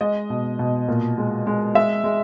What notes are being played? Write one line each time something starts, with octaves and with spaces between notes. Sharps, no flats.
G#3 D#5
B2
B2
A#2
G#3
G#3
G#3 E5
G#3